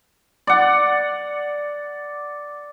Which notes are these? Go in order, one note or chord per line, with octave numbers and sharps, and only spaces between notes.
D5 F#5